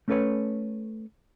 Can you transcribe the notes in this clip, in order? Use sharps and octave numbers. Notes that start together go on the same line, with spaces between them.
A3 C#4 A4 B4 C#5